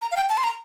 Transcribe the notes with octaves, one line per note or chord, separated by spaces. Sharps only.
A#5
F5
G5
A5
C6
A#5